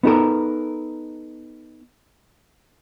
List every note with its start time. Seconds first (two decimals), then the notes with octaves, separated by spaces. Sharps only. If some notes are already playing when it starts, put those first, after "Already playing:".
0.03 B3 D#4 A4 A#4